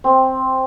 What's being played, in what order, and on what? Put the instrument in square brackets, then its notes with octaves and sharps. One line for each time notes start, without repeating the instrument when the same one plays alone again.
[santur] C4